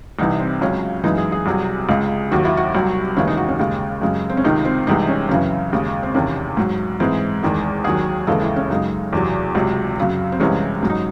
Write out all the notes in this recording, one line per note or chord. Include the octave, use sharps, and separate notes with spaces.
C2 C3 E3 D#4
C4
C#2 C#3 F#3 C#4
F#2 E3 G#3 D#4
G#4
G#4
C2 C3 F#3
C#2 C#3 G#3
D#2 D#3 F#3 F#4
E4
F#4
C2 C3 F#3
D#2 C#3 E3 G#3 C#4
D#4
F#4
C#4
D#2 C#3 G#3
F#2 C#3 G#3
C4
C#4
C#2 C3 D#3 D#4
C4
C2 C3 E3 G#3 D#4
C#4
F#2 C#3 E3 C#4
D#2 C#3 G#3
C4
E2 C3 D#3 C#4
G#2 F#3
G#2 E3 G#3 C4
E2 D#3 G#3
D#2 D#3 F#3 G#4
D#2 C#3 E3 G#3 A4
E4
C#4
F#2 C#3 G#3 D#4
E2 C3 F#3
C#2 C3 F#3
F#2 C#3 F#3
C4
C2 C3 E3 G#3 C#4
G#2 F#3 C#4
D#4